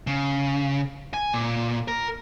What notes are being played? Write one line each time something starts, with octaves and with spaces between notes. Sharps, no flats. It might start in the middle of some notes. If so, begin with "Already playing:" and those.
C#3
G#5
A#2
A#4